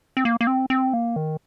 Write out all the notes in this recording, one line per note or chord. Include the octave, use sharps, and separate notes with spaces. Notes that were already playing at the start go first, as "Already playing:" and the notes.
C4
A#3
A#3
C4
C4
A#3
D#3